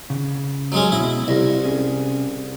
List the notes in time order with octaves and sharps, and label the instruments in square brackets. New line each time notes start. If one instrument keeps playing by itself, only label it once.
[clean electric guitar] C#3
[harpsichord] F#3 G#3 C#4
[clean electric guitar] B2 [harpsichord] E4
[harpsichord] C2 [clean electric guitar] E4 D#5
[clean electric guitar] C3 C#4 G#4